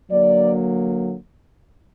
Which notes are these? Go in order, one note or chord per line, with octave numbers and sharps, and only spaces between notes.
D3 F#3 A#3 D5